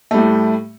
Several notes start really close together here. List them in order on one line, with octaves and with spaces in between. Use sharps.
A3 G3 A2